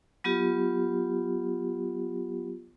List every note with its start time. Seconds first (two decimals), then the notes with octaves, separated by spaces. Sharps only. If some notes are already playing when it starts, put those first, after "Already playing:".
0.24 F#3 B3 F4 G4